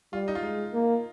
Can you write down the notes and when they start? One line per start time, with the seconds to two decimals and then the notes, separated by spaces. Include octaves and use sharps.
0.13 G3 F4
0.28 D#4
0.35 F4
0.43 G#3 D#4
0.73 A#3